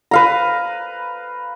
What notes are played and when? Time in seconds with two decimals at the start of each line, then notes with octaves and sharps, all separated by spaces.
0.11 B4 F5 A#5